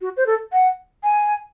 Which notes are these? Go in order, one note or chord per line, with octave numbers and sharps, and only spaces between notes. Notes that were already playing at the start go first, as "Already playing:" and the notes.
F#4
C5
A4
F#5
G#5